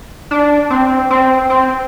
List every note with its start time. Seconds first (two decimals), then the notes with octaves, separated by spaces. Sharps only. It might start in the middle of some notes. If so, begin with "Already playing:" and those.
0.31 D4
0.70 C4
1.10 C4
1.50 C4